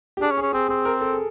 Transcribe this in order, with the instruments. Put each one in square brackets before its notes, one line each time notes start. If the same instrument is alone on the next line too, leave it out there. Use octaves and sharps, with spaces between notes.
[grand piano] G4
[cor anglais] D4 [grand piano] G#4
[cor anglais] C#4
[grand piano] G#4
[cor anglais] C#4
[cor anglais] C4 [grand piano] G#4
[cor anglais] C4 [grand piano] G#4
[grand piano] A#4
A4
G#4